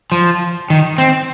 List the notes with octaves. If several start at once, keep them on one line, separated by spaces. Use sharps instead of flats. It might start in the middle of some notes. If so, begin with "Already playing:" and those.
F3
D#3
C4